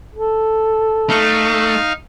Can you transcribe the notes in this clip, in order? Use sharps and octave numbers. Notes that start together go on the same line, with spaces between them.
A4
A3 D#4 F5